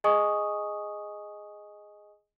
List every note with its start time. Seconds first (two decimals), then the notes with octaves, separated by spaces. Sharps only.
0.04 G#4 D#5 G#5 C#6 D#6